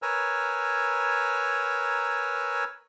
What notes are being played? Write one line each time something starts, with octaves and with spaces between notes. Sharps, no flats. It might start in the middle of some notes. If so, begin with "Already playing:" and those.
A#4 B4 C#5 G#5 A#5 E6